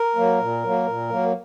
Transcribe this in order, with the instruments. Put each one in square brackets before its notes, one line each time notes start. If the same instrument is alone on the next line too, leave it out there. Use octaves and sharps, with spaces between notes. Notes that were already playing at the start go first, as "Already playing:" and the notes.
Already playing: [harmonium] A#4
F#3 A#3
A#2
F#3 A#3
A#2
F#3 A#3